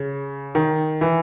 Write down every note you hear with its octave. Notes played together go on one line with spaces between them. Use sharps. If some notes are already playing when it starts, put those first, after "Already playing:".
Already playing: C#3
D#3
E3